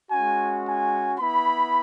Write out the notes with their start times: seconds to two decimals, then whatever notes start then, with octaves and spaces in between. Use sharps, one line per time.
0.11 G#3 C#4 F#4 G#5
0.66 G#5
1.19 B3 E4 B5